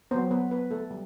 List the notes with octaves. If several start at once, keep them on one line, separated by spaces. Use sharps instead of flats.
F#3 B3 C4 C5
B3 B4
B3 B4
A3 A4
G3